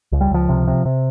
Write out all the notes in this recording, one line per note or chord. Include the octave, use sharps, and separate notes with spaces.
C#2
G3
C#2 F3
C3
C3
C3